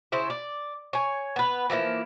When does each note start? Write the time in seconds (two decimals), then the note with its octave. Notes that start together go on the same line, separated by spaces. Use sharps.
0.12 C#3 E4 C5
0.30 D5
0.93 C#5 G#5
1.36 B3 B4
1.70 E3 F3 A#3 E4